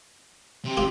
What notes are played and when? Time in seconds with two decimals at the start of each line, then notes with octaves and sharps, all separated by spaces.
0.65 C3
0.77 F4 G4